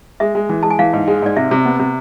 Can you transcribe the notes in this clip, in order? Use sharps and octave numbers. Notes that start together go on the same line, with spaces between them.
G#3 E5
G#3
E3
G#3 A5
G#5
E3 F5
G#2
G#3
G#2 D5
C3 E5
C3
B3
C3